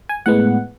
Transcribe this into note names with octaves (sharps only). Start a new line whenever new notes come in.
G#5
A2 G#3 B3 F#5